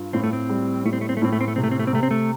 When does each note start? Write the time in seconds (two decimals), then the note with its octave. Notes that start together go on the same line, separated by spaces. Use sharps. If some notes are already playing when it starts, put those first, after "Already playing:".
Already playing: G2 F4
0.13 A2 C4
0.23 A3
0.33 C4
0.49 G3
0.85 A2 A3
0.93 C4
1.01 A3
1.09 C4
1.17 A3
1.22 A2 C4
1.33 A3
1.41 C4
1.48 A3
1.56 C3 C4
1.64 A3
1.71 C4
1.79 A3
1.87 C4
1.93 C3 A3
2.03 C4
2.11 A3